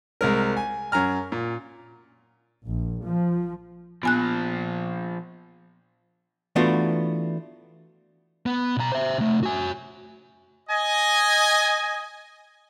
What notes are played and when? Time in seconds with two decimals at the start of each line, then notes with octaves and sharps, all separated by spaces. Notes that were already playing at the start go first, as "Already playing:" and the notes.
0.21 C2 G#3 A#4
0.57 G#5
0.92 F#2 G#5 A#5 F6
1.32 A#2
2.66 A#1
3.04 F3
4.03 A#2 F3 B3 G#5 F#6
6.56 E3 A3 B3 D4 F4 F#4
8.46 B3
8.77 B2 A#5
8.92 C5 E5
9.18 C3 A3
9.43 F#4 G#5
10.70 D#5 G#5